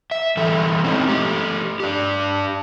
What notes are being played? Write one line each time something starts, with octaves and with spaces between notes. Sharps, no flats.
E5
E3 G3 A4
G#3 C4 C#4 D#4 E4
A3 G4
D4 G4